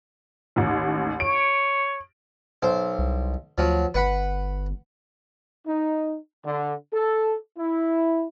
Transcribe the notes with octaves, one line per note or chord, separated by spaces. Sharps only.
A1 D#2
C#5 D7
B1 C5
C2
D2 F3 F#3
G1 B4 F#5 B5
D#4
D3
A4
E4